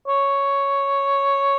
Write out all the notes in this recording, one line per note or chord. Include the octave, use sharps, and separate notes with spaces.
C#5